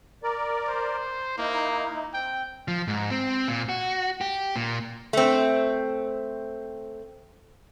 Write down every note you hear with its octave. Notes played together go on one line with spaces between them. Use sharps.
A#4 D5
C5
A#3 D#4 E4
C4 G5
F3
G#2
C4
A#2
F#4
G4
A#2
A3 C4